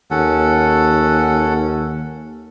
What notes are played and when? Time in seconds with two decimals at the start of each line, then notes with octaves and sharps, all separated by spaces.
0.11 D#2 C#4 A4 F#5